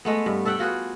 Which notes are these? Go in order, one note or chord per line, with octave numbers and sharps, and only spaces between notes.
G#3 A3 B3
G2
A4 E5 F#5 G5
F4 F#4 G#4 B4